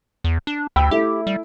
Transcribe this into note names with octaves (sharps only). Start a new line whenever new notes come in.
E2
D4
D2 G5 B5 E6
A3 E4 G4
G3